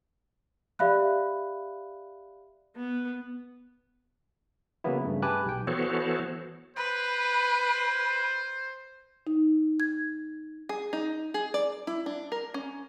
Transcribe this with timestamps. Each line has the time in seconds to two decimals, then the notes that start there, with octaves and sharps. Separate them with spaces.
0.79 G4 D5 E5 F5 B5 F#6
2.76 B3
4.84 C#3 E3 F#3 A#3 B3 E4
5.04 G2 C#3 A3
5.22 G4 B4 G#5 A5 D6 F#6
5.46 B1 G5
5.67 E3 B3 F#4 A4 C5 C#5
6.76 B4 C5
9.27 D#4
9.80 G#6
10.69 G#4
10.93 D#4
11.34 G#4
11.54 D5
11.87 E4
12.06 D4
12.32 A#4
12.54 C#4